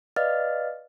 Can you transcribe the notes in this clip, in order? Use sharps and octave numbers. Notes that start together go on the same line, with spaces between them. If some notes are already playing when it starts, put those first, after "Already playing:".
B4 D5 D#5 F5 F6 A6